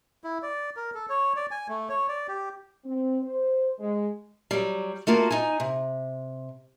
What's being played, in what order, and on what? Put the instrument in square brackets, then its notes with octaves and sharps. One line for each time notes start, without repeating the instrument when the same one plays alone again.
[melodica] E4
D5
A#4
A4
C#5
D5
G#5
A3
C#5
D5
G4
[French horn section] C4
C5
G#3
[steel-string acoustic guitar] F#3 G3
A3 A#3 F4 F#4
D#4 G#5
C3